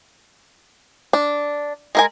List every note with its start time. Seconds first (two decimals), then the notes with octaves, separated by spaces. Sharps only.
1.13 D4
1.95 G#3 A#4 G#5